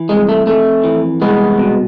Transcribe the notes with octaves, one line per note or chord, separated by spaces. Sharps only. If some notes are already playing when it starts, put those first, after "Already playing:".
Already playing: E3
C2 G#3
A3
F2 A3
E3
C2 G#3 B3
B2